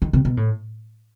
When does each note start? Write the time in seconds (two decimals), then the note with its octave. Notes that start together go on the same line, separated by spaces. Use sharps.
0.02 D#3
0.13 C3
0.25 B2
0.37 A2